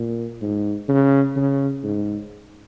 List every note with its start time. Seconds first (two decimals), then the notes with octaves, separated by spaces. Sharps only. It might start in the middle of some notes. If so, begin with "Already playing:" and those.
Already playing: A#2
0.42 G#2
0.89 C#3
1.36 C#3
1.83 G#2